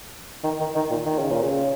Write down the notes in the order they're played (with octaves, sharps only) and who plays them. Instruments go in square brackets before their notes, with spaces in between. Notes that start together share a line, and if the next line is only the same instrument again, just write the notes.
[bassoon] D#3
D#3
D#3
A#2
D#3
C#3
A#2
C#3